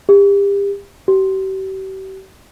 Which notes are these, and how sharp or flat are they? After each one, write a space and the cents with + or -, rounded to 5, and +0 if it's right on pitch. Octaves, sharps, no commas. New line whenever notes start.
G4 +35
G4 -40